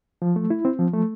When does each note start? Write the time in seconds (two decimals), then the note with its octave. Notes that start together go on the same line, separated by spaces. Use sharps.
0.22 F3
0.36 A3
0.50 E4
0.65 C4
0.79 F3
0.93 A3